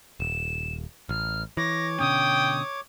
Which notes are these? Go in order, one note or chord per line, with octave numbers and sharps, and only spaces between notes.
D#1 E7
A1 F6
E3 C#5 D6 A#6
B2 D3 C#4 G5 D#6